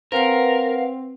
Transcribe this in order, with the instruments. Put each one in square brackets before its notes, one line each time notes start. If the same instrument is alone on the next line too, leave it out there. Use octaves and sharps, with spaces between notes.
[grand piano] C4 [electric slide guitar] A#4 [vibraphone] B4 F#5 [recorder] F5